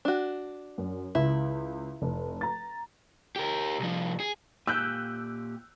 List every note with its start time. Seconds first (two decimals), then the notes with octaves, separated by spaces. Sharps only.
0.05 D4 F#4
0.78 F#2
1.15 C#2 E4
2.02 F1
2.41 A#5 A6
3.36 G4 A#4
3.80 C2 F3
4.20 G#4
4.67 A#2 G4 G#5 E6 F#6 G6